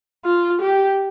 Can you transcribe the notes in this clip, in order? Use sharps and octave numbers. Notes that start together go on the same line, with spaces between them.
F4
G4